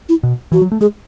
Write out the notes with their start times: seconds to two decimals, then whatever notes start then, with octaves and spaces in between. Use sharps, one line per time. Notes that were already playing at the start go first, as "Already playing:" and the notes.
0.09 E4
0.23 B2
0.52 E3 F#4
0.62 F#3
0.72 A3
0.81 G#3 G#4